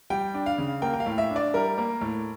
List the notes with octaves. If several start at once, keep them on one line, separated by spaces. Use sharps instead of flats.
G3 G5
D4
F5
C#3
A#3 G5
G5
F5
A2
E5
D4
D5
G3 A#4
A#3
A2